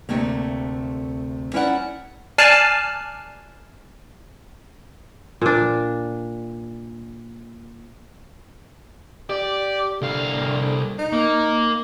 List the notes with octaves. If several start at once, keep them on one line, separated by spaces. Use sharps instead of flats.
D2 C3 A3 A#3
C#4 E4 A#4 D5 E5 F#5
D5 G#5 A5 F6 F#6 C7
A#2 D4
G4 D5
C2 D3 F5
D#4
A#3